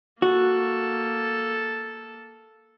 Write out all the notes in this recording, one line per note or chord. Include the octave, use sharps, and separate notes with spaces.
A#3 F#4 A4